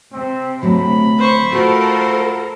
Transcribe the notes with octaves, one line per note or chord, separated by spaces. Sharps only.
C3 C4
D2 F#3 A3 B5
C5 C#6
A3 F4 F#4 A4 A#4 C5